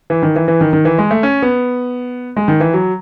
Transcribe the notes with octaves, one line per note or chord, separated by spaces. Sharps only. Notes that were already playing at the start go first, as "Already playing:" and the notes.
E3
D#3
E3
E3
D#3
D#3
E3
G#3
A3
C#4
B3
G#3
D#3
E3
F#3